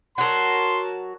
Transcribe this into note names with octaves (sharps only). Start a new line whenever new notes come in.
F#3 F#4 A#4 A5 C6